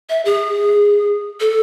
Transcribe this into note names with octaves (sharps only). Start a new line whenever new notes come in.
E5
G#4
A4